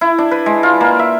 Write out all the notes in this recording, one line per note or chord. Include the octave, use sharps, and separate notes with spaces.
E4
D4
B4
G#3
F4
A#3
E5